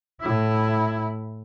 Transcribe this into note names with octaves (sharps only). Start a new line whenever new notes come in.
A2 E4